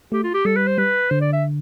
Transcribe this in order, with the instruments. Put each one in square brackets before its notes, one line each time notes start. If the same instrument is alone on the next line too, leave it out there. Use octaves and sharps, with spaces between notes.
[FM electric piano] A3 [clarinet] G4
[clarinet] F4
G4
[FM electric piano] G3 [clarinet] A4
[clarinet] B4
C5
[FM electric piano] G3 [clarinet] B4
[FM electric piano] D3 [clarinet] C5
[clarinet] D5
E5